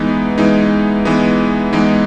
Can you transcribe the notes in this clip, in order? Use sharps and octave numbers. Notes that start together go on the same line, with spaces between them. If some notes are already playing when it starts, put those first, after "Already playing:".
Already playing: E3 G#3 B3 D#4
E3 G#3 B3 D#4
E3 G#3 B3 D#4
E3 G#3 B3 D#4